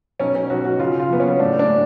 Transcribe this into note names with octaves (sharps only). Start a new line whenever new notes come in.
B1 C#4
C#4
B1 F#4
F#4
C#3 F4
F4
F#2 B3
C#4
A2 D4
D4
A2